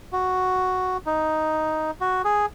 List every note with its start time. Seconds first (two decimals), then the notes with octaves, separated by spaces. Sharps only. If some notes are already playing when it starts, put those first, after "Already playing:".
0.12 F#4
1.06 D#4
2.01 F#4
2.25 G#4